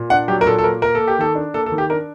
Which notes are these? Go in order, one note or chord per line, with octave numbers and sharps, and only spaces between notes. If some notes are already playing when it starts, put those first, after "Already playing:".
Already playing: A#2
D4 F#5
F#3 G4
A#4
A#2 A4
A4
A#3 A#4
A#3 A#4
A4
A#3
G4
D#3 A4
D4
A#3 A4
A4
D#3
G4
D4 A#4